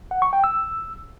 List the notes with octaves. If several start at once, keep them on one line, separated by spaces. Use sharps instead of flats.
F#5
C#6
G5
E6